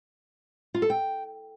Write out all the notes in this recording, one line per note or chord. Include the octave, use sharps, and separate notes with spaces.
F4
A4
G5